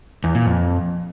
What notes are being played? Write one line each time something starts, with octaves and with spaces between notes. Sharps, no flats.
E2
A#2
F2